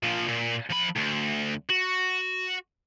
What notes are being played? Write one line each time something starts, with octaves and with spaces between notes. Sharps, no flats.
A#2 F3
A#2
F3 B5
D2
F#4